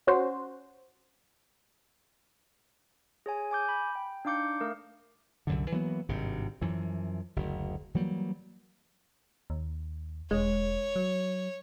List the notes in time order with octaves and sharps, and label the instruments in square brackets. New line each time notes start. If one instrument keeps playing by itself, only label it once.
[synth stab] C#4 F#4 C5
[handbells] G#4 C#5 G#5
G#5 D6 G6
B5
G5
D4 D#4 F5 D6 G6 C#7
A3 A#4 F5
[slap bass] C2 F#2 D3
E3 F#3 A#3 B3
G#1 G2 C3
F#2 E3 F3
F#1 D2
E3 F#3 G3 A#3
[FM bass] D#2
[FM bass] E1 [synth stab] G#3 [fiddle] C#5
[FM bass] F#3